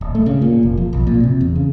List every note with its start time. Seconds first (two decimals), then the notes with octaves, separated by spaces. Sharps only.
0.01 D1
0.15 A3
0.26 C#3
0.42 A#2
0.63 F1
0.77 F3
0.93 B1
1.07 A#2
1.23 C3
1.41 E2
1.56 C#3